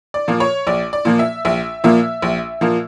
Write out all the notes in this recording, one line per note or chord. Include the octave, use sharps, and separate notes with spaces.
D5
A#2 F3 A#3
C#5
A#1 D5
D5
A#2 F3 A#3
E5
A#1 E5
A#2 F3 A#3 E5
A#1
A#2 F3 A#3